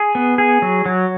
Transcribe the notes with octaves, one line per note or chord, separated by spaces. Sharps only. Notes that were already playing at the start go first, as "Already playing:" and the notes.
Already playing: G#4
B3
G#4
F#3
F#3